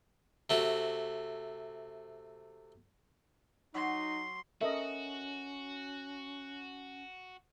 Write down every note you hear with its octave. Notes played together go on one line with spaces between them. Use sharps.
C3 A3 F#4
F#3 D#4 C6
C#4 F#4 A4 A#4 D#5 E5